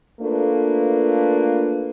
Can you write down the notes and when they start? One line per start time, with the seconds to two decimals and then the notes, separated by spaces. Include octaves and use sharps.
0.20 A3 A#3 D4 F4 A4 B4